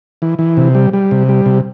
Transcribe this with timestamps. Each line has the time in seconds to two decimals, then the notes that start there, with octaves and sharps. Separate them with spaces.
0.22 E3
0.39 E3
0.57 C3
0.75 G3
0.93 G3
1.11 C3
1.29 G3
1.46 C3